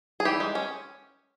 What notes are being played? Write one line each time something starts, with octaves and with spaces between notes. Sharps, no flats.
G#4
E3 G4
G#3
C#4